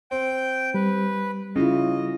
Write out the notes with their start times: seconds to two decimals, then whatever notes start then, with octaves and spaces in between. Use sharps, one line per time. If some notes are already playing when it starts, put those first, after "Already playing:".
0.11 C4 G5 G6
0.74 G3 B4
1.56 C#3 C#4 E4 F4 D#5